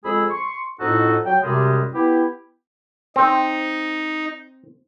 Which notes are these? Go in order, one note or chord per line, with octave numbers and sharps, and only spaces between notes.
F2 G#3 G#4 B5 E6
C6 C#6
F2 A2 D#4 F#4 A4
F#3 G5
F#2 C3 G3 G#3
B3 E4 G4
C4 D#4